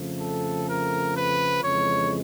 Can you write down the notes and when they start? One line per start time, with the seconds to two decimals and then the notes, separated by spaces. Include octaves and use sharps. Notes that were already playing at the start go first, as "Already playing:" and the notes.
Already playing: F2 C#3 F3 A3
0.19 A4
0.67 A#4
1.15 B4
1.62 F2 C#3 E3 G#3 C#5